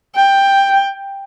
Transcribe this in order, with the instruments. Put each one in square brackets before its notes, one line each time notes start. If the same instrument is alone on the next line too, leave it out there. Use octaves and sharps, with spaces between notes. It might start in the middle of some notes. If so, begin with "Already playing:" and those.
[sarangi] G5